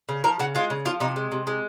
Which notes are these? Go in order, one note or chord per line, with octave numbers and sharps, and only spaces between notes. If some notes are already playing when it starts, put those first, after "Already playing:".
C#3
F3 A#4
C#3 F#4
G#3 F4
C#3
F3 F4
C3 D#4
G#3
C3
G#3